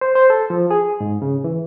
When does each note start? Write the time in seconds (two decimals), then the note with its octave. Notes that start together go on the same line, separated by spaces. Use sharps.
0.01 C5
0.15 C5
0.30 A4
0.50 F3
0.71 G#4
1.01 G#2
1.22 C#3
1.44 E3